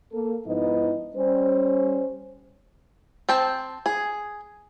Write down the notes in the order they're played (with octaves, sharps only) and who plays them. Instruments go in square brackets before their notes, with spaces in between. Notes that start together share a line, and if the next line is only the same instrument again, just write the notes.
[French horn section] A#3 A4
G#2 F3 B3 D#4 E4 D#5
G3 C#4 C5
[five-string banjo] C4 G5 A5
G#4